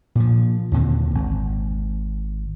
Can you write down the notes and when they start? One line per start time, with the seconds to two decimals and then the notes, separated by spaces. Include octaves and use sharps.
0.15 A#2 F3
0.72 D#2 A#2 D3 C4
1.15 G#1